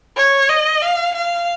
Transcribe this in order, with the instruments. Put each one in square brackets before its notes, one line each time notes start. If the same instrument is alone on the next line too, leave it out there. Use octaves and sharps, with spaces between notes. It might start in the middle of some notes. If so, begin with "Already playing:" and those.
[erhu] C#5
D#5
F5
F5